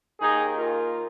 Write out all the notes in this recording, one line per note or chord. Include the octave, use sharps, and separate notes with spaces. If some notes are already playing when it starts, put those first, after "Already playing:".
D#2 D#3 A#3 D#4 G#4
F4 A#4